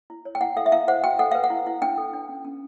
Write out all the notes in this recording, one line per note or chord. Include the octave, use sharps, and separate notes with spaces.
E4
C#5
G5
E4 F#5
A4 F5
E5
E4 F5
C5 F#5
F#4 G5
A4 F#5
B4 F5
F#5
E4
E4
D4 G5
A4
D4
C#4
C#4